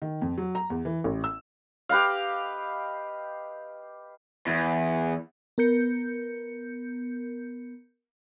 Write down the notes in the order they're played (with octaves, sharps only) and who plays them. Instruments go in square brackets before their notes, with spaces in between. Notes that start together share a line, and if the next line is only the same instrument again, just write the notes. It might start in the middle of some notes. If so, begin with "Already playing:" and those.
[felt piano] D#3
F2
F#3
A#5
E2
E3
A1
E6
[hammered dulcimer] G4 B4 D#5 F5
[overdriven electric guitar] E2
[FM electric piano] B3 A#4 G6 C#7